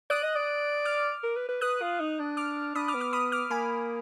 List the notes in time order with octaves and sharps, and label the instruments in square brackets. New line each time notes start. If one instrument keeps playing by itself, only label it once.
[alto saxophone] D5 [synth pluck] D#6 F#6
[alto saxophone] D#5
D5
[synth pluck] D6 F6
[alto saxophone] A#4
B4
B4
[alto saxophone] B4 [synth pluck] D#6 F#6
[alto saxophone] F4
D#4
D4
[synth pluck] D6 F6
[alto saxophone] D4 [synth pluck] B5 D#6
[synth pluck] D6 F6
[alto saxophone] B3
[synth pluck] D6 F6
B5 D#6
D6 F6
[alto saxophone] A#3 [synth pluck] G#5 B5